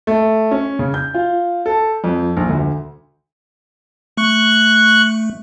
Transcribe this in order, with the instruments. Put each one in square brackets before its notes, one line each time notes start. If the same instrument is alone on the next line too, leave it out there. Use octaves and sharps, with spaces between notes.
[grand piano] A3
C#4
C#3
G6
F4
A4
F2
A#1
D2
[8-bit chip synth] A3 [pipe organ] C#6 F#6